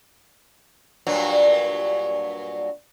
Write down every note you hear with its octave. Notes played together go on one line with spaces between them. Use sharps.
G2 A#2 F#3